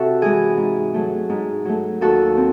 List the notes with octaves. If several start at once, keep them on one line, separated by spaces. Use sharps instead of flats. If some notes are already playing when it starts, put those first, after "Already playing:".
Already playing: C3 F#4 A4 E5
E3 G#3 G#4
G#2
F#3 A3
G#2
F#3 A3
D#2 F#4 A4
C4